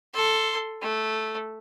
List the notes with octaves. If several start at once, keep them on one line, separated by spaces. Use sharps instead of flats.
A4 C6
A3